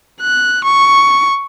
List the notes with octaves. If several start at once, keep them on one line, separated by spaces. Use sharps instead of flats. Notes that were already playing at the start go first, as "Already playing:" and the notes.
F#6
C#6